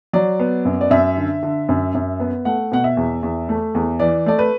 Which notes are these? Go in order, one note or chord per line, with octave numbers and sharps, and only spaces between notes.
F#3 D5
B3
F#2
D5
F#2 E5
D3
D3
F#2
F#2
B3
A3 F#5
B2 F#5
E5
E2
E2
A3
E2
E3 D5
A3 D5
B4